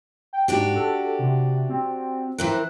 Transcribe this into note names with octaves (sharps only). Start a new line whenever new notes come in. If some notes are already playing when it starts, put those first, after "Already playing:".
G5
G#2 D4 F#4 G4
A4
C3
C4
E3 C4 A#4 F#6